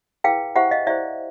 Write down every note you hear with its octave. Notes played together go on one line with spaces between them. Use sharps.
E4 G#4 B4 F5 G5
E4 G4 C5 E5 F#5
D#5 F5
E4 G4 C5 D5 E5